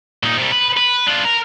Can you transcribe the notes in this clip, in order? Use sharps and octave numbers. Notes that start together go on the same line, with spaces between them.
A#2 D#4
C3 G3
B4
B4
D4 F4
A#4